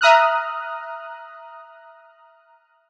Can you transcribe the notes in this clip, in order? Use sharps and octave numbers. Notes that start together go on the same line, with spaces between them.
E5 A#5 D#6 F6 F#6